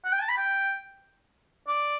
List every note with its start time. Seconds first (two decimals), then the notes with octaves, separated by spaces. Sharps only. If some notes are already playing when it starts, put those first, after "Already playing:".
0.05 F#5
0.12 G5
0.21 A5
0.29 B5
0.37 G5
1.68 D5